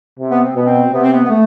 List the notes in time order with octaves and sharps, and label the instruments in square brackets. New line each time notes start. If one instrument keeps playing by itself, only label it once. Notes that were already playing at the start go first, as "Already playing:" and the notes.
[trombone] C3
[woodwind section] B3
C4
[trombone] B2 [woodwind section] B3
[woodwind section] C4
[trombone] C3 [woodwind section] B3
[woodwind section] C4
B3
B3
A3